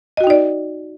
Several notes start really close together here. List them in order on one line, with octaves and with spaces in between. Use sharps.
D#5 F#4 G5 D#4 D5